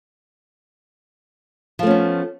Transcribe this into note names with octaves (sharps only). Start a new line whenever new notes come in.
F3 A3 B3 C#4